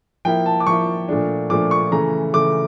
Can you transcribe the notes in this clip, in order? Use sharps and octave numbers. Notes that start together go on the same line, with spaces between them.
F3 A#3 E4 G5
A5
D6
F3 A#3 E4 C#6
A#2 F3 A3 D4
A#2 F3 A3 D4 D6
C#6
C#3 E3 A3 A#5
C#3 E3 A3 D6